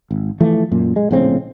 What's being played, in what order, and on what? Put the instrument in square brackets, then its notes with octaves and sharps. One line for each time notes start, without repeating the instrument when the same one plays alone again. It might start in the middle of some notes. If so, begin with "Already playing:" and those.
[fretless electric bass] G#1
E3 F3 A3
F#2 A#2
G#3
A#1 A2 C#3 C4